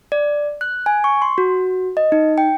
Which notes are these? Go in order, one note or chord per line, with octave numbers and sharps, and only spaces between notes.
D5
F#6
G#5
C#6
C6
F#4
D#5
D#4
G5